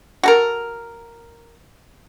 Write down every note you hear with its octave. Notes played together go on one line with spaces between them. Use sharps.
F#4 A4 A#4